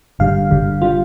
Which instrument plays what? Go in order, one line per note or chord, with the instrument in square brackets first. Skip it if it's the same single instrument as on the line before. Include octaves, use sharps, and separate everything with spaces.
[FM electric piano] G1 G2 D3 G3 F5
G1 G2 D3 G3
D3 G3 F4